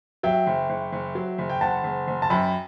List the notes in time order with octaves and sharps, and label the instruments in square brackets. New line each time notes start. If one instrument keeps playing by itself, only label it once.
[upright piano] F#3 [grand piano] E5 G5
[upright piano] F#1
F#1
F#1
F#3
F#1
[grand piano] G5
[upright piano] F#1 [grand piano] F#5 A5
[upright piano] F#1
F#1
[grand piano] A5
[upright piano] F#2 [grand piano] G5 B5